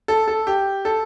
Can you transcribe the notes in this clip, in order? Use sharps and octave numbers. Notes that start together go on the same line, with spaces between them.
A4
A4
G4
A4